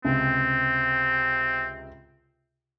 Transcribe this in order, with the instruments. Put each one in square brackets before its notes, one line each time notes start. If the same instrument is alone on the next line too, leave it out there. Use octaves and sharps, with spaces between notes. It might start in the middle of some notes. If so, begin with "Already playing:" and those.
[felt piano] C#2 C3 [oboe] C4